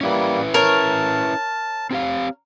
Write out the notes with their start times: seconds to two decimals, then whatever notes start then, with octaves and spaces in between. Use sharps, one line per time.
0.01 G3 A#3 C#4 E4 B4
0.54 A#4 C#5 A5
1.91 C4 G4 F5